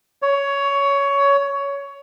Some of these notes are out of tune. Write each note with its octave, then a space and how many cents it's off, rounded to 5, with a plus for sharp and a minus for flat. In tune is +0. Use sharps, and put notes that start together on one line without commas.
C#5 +15